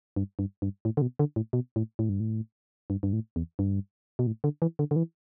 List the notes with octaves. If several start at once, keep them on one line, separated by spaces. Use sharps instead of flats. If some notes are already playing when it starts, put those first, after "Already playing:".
G2
G2
G2
A2
D3
B2
D3
A2
B2
A2
A2
G2
A2
G2
G2
A2
E2
G2
B2
A2
D3
E3
D3
D3
E3